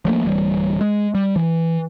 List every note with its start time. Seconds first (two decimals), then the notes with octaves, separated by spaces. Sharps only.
0.05 F3 F#3 A3 A#3
0.25 D1 E3 G3
0.81 G#3
1.15 G3
1.36 E3